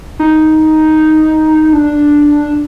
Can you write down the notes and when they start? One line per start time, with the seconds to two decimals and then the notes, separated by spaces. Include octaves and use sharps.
0.19 D#4
1.73 D4